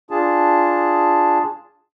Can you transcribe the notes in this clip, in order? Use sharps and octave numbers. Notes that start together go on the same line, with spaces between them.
D4 F4 G#4 A5